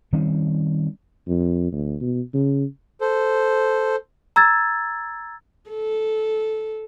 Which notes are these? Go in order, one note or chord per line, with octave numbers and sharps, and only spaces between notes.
D#3 G3 C4 C#4
F2
D2
B2
C#3
A4 C5
A#5 E6 G#6 A6
A4